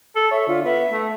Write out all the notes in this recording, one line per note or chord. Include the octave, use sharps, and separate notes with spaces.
A4
C#5 E5
D3 F4
B3 E5
A3